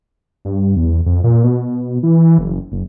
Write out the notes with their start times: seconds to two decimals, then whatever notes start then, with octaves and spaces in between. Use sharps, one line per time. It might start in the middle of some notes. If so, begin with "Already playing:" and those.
0.45 G2
0.76 E2
1.06 F2
1.24 A#2
1.44 B2
2.03 E3
2.38 F#1
2.72 F#1